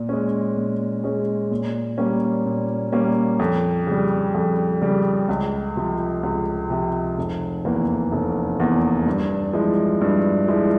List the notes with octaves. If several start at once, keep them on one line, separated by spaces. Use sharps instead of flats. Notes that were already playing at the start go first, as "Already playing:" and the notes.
Already playing: A#2
G#3 C#4
A#2
G#3 C#4
A#2
G3 A#3 C#4
A#2
G3 A#3 C#4
F2
C#3 G3
F2
C#3 G3
C#2
C3 F3
C#2
C3 F3
F1
E2 E3 A#3
F1
E2 E3 A#3
G2
F3 G#3 E4
G2
F3 G#3 E4